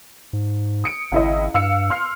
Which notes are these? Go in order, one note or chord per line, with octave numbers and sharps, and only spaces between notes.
G#2
D#6 C#7 D7
G#1 C#2 E4 D#5
G2 F5 E6 C#7
C6 F6 C7